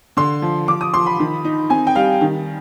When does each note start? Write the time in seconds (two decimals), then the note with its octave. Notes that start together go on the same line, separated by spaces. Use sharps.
0.17 D3 C6
0.42 F3
0.68 F3 D6
0.81 D#6
0.94 F3 C6
1.06 B5
1.20 D#3
1.45 D#4
1.70 C4 G#5
1.87 G5
1.95 G3 F5
2.21 D#3